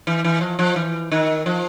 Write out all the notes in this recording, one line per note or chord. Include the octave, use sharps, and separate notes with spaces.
E3
E3
F3
F3
E3
D#3
F3